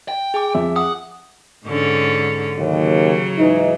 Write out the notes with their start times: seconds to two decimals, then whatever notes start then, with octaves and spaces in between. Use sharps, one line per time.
0.08 G5
0.34 G#4 G#5 D6
0.54 F2 E5
0.76 F#5 D#6
1.66 G#2 D3 C#4
2.57 D#2 C#3 F#3
3.38 G#2 E3 D#4